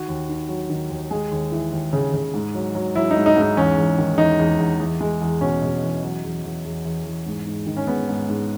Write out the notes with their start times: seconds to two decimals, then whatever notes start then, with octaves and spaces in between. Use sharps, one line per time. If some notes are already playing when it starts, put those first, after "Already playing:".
Already playing: D#3 F#4
0.08 D#2
0.29 D#3
0.49 F#3
0.70 D#3
0.90 D#2
1.11 G#3 G#4
1.31 D#2
1.52 E3
1.72 D#2
1.93 C#3
2.13 C#3
2.34 G#2
2.55 F#3
2.75 F#3
2.95 F#3 E4
3.11 D#4
3.16 G#2
3.26 D#4
3.36 G#2
3.42 D#4
3.57 E2 C#4
3.77 E2
3.98 D#3
4.18 E2 D#4
4.39 E2
4.59 E2
4.80 E2
5.01 G#3
5.21 E2
5.41 B2 C#4
5.62 B2
5.82 E2
6.03 F#3
6.23 E2
6.44 E2
6.64 E2
6.85 E2
7.05 E2
7.26 G#2
7.46 G#2
7.66 D#3
7.77 C#4
7.87 G#2 B3
8.08 G#2
8.29 G#2